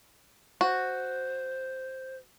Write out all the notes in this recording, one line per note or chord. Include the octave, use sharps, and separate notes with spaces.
F#4 C5